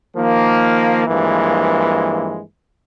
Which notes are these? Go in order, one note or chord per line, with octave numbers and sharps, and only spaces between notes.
D#3 F3 A#3
G2 E3 F3 G#3 A#3